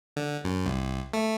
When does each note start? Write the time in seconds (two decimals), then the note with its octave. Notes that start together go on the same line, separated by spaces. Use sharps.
0.16 D3
0.44 F#2
0.66 C2
1.13 A3